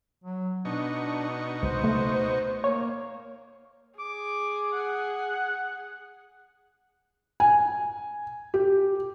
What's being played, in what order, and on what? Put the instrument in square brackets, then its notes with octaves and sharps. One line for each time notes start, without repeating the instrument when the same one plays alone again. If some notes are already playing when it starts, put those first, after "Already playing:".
[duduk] F#3
[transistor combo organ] B2 D#4 C#6 [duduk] D4
[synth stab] C#2 [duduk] C5
[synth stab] A3
[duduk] A#3 [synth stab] C#5
[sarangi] G#4 [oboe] D6
[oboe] F#5
[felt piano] G#5
G4